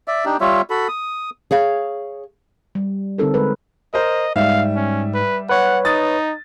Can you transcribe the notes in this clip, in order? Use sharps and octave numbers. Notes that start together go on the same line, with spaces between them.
D5 E5
D4 D#4 G4
G3 F4 C#5 E5
F#4 A4 B5
D#6
G#4 C#5 F5
G3
D3 C4 D#4 A4 A#4
G#3 A#4 B4
A#4 C5 D#5
G#2 G3 E5 F5
C#4
B4
B4 C#5 F#5
D#4 D#6 A6